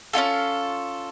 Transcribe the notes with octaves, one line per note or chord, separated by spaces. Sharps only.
C#4 D#4 F4 A4